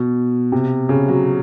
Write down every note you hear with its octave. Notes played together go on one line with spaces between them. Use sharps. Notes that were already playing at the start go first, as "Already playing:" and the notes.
Already playing: B2
C3
C#3
F#3